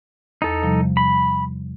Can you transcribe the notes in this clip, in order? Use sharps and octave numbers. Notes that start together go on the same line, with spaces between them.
E2 D#4 A4
C3 F3 G3
B5